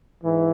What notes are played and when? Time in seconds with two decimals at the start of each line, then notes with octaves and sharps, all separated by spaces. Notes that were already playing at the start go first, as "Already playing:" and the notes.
0.23 G#2 E3